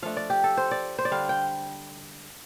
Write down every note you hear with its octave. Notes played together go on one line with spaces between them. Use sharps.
F3 A3 D4 F5
D5
G4
A4
C5
D5
C5
D5
D3 G3 D4 F5
G5